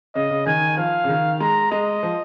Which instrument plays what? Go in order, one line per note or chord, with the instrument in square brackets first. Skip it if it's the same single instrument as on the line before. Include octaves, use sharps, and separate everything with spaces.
[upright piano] C#3 [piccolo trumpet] D#5
[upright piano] C#3
[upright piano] D#3 [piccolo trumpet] G#5
[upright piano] F3 [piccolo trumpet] F5
[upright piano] C#3
D#3
[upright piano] G#3 [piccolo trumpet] A#5
[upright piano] G#3 [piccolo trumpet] D#5
[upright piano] F3